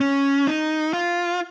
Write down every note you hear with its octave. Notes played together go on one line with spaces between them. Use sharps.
C#4
D#4
F4